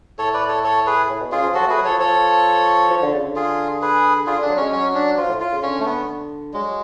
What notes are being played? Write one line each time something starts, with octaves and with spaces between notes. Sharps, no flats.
A2 A4 C#5
B4 D5
A4 C#5
A4 C#5
G#4 B4
A2
B2
C#3 F4 G#4
F3
F#3 F#4 A4
A3 G#4 B4
F#3
F3 A4 C#5
F3 A4 C#5
F3
D3
C#3
D3
F4 G#4
G#4 B4
D3 F4 G#4
D3 D4
F#3
G#3 C#4
F#3 C#4
D4
F3 F4
A2
F4
C#3
D3 C#4
A3
B3
F#3 G#3